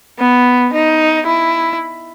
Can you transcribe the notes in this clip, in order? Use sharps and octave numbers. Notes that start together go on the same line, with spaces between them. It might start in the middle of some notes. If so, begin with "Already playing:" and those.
B3
D#4
E4